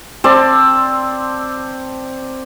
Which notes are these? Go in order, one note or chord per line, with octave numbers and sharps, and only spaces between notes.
C4 D5 A5 C6